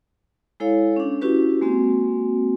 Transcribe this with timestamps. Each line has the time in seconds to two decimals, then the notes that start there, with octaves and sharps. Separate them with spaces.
0.60 G#3 E4 A4 C#5 F5
0.96 C#4 D4
1.21 C#4 E4 F#4 G4 B4
1.61 G#3 A#3 C4 F#4